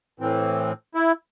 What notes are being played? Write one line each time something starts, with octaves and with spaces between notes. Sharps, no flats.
A2 E3 C4
E4